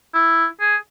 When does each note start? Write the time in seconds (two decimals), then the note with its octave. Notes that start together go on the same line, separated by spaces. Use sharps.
0.14 E4
0.60 G#4